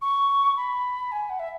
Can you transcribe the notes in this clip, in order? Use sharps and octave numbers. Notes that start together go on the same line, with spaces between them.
C#6
B5
G#5
F#5
E5